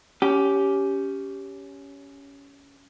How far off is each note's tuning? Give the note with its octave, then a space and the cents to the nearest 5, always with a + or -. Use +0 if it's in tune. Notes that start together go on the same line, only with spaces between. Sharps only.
C#4 +15 G4 -5